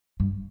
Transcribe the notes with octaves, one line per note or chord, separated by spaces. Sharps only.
G2